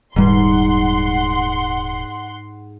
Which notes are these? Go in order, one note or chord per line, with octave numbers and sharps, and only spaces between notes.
D#1 G#2 G3 F#5 C6